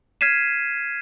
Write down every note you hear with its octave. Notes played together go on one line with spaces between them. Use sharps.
F6 G#6 B6 C7 D#7 E7